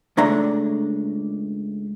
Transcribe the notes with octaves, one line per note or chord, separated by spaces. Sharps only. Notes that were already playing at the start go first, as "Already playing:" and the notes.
C#2 A3 D4 A#5